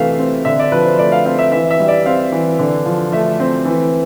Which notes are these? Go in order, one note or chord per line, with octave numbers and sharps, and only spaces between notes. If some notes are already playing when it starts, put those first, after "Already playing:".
Already playing: C3 E3 A3 E5 F5
C4
D3 E5
D5
F3 B4
C5
A3 D5
F5
C4 F5
E5
E3 E5
E5
G3
D5
C4 F5
E3
D3
F3
A3 E5
C4
E3